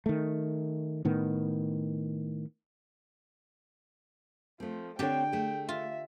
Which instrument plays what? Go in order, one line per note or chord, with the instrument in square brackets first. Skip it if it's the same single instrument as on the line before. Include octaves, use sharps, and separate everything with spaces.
[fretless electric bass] D#3 A3
A2 D#3 B3
[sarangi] F3 [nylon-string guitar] A3 C4
[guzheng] D3 G4 [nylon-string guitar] C4 A4 C#5 [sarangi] G5
[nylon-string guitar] A3 G#4
[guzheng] F4 [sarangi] E5